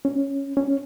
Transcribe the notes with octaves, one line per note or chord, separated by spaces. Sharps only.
C#4
C#4